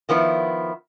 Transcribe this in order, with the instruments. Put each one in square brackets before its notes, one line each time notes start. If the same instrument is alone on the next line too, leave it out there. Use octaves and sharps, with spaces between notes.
[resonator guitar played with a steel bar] D#3 F3 B3 E4